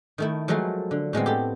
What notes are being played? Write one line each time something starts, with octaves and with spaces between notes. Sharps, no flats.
D#3 A3 E4
F3 F#3 G#3 A3 A#4
D3
A2 G#3 B3 C4
G4 A4